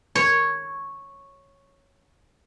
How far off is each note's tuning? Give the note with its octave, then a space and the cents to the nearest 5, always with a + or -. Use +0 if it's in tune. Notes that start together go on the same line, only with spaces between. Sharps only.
C#5 -5